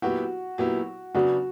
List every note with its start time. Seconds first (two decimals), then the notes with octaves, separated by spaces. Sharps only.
0.02 A#2 F#3 B3 E4 F#4 G4
0.58 A#2 F#3 B3 E4 G4
1.15 C#3 F#3 B3 D4 F#4